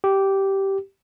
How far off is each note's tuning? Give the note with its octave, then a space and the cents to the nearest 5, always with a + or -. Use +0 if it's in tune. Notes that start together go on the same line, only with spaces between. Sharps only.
G4 -10